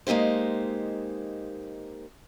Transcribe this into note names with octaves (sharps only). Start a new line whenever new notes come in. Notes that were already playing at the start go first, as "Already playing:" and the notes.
G#3 A#3 D#4 G4 C5